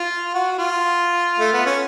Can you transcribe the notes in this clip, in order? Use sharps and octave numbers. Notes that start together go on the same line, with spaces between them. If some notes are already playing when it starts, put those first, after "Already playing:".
Already playing: F4
F#4
F4
A3
B3
C#4